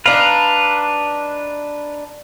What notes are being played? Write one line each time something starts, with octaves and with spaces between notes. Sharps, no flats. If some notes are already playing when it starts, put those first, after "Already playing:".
D4 D#4 B4 F5